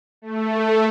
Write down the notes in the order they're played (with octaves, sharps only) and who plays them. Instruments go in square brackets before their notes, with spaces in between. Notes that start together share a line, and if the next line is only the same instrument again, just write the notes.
[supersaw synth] A3